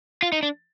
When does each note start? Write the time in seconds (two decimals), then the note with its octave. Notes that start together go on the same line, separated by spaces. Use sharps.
0.22 F4
0.32 D#4
0.43 D4